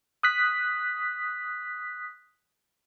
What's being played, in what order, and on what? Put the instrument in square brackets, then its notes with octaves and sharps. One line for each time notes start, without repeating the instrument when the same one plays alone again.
[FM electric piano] D#6 F#6 B6